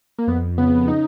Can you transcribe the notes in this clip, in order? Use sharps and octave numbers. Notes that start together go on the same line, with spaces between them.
A#3
F2 B3
C#3 B3
D#4